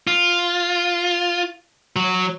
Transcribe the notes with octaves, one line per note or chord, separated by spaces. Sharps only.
F4
F#3